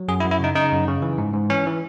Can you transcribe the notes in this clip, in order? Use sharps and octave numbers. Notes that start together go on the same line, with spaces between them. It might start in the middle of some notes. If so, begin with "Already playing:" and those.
Already playing: F#3
F#2 G#4
E4
F#2
E4
C#3 D#4
C#3 D#4
F#2
C#3
E3
G#2
G#2
E3 C#4
E3